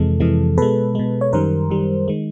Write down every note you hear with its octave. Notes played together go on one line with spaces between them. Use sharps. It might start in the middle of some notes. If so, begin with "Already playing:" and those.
Already playing: F2 C3 E3 G#3 A4
F2 C3 E3 G#3
B2 G#3 A4 B4
B2 G#3
C#5
F#2 D#3 G3 A#4 C5
F#2 D#3 G3
D#3 G#3